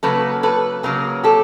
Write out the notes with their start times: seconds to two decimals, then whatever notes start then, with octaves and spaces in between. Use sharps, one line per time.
0.03 C#3 F#3 A#3 A4 B4
0.43 A4 B4
0.83 C#3 F#3 A#3 G#4 A#4
1.24 G4 A4